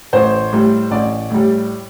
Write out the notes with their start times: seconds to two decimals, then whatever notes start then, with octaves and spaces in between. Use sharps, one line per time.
0.13 A1 C5
0.53 A2 G3
0.91 A1 D5
1.30 A2 G3